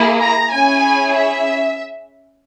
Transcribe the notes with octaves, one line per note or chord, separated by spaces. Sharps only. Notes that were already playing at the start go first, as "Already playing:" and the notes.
Already playing: A#3 E4 G#4
A#5
C#4 E4 G#4 G#5
E5